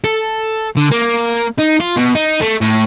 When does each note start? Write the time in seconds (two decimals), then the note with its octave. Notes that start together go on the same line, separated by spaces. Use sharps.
0.04 A4
0.77 D3
0.92 A#3
1.58 D#4
1.80 F4
1.97 B2
2.15 D#4
2.41 A3
2.61 A2